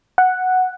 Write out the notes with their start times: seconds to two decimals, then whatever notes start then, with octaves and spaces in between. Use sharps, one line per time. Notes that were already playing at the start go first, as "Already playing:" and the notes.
0.18 F#5